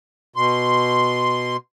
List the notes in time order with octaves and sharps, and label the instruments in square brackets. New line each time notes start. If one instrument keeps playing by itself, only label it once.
[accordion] B2 C6